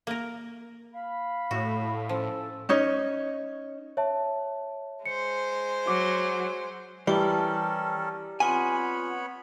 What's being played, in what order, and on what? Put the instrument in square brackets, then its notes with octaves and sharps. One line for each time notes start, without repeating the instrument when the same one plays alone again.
[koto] A#3 A#4
[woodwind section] F5 B5
[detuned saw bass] A2 [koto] F#4
[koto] F3 [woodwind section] C#4 A4
[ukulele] C#4 D#4 C#5
[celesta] C#5 E5 A5
[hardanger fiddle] G#3 C5 [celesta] C#7
[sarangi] F#3 [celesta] D6
[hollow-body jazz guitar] E3 [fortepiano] G3 [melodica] C#4 A4 A#4 [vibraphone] G5 A5
[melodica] B3 C#5 B5 [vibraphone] C4 F4 F#5 [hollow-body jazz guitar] G#5